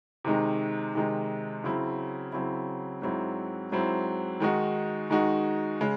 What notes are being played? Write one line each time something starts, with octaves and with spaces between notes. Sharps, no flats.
C3 D#3 G#3 D#4
C3 D#3 G#3 D#4
C#3 F#3 C4 E4
C#3 F#3 C4 E4
G#2 F#3 C4 E4
G#2 F#3 C4 E4
D#3 G#3 D#4 F#4
D#3 G#3 D#4 F#4
C#3 G#3